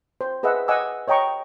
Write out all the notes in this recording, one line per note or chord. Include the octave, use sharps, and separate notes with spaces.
C5
G#4 B4 D#5 E5 F#5 E6
D#5 F#5 G#5 D6 E6
C#5 D#5 G5 A#5 C#6